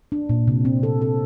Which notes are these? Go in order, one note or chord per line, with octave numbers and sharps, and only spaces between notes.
D4
A#2
C3
C4
A4
A4